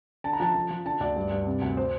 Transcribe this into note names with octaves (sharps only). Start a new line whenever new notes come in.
D3 A5
A#5
F3 A5
F3
F3
D3 A5
D2 D5
G2
G2
C3
D2
C5